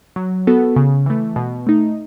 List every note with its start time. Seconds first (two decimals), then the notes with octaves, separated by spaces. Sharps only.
0.16 F#3
0.47 B3 F#4 A4
0.76 C#3
1.06 E3 A3
1.36 B2
1.67 A3 D#4